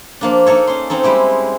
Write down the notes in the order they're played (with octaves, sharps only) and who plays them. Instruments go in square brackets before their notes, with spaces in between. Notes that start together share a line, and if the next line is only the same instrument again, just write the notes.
[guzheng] F3 A#3 D4
A#3 D#4 A4 C#5
C#4 C6
C4 C#4 D#4 A4
G3 G#3 E4 G4